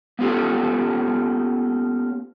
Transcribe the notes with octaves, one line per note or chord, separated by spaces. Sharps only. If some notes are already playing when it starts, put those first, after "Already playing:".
A#3 B3 C#4 F4 G4 A4